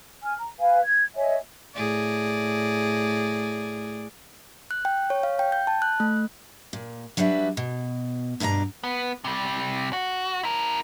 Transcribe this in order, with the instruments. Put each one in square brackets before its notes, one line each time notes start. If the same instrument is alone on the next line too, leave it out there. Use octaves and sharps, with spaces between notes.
[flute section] G#5 F6
A#5
B4 F5 G#5
G#6
C#5 D#5 E5 G#5
[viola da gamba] A2 G#4 D5
[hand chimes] F#6
G5
C#5
F5
G5
G6
A5
F#6
A3
[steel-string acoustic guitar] A#2
F#3 G3 D4 B4 E5
B2
G2 B2 D4 E4 A#5
[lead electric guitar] B3
C3 G3
F#4
E4 A#4